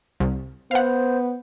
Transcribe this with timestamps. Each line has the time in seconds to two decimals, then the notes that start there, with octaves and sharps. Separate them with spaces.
0.20 C2
0.71 B3 C5 F5 F#5